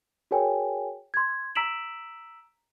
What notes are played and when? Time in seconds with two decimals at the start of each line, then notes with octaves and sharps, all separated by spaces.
0.31 F#4 G#4 A#4 C#5 G5 G#5
1.14 C6 G#6
1.55 A#5 E6 B6 D7 E7 F#7